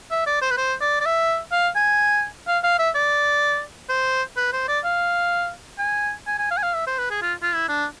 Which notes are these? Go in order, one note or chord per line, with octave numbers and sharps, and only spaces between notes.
E5
D5
C5
B4
C5
D5
D5
E5
F5
G#5
F5
F5
E5
D5
C5
B4
C5
D5
F5
G#5
G#5
G#5
F5
G#5
F5
E5
C5
B4
G#4
F4
F4
E4
D4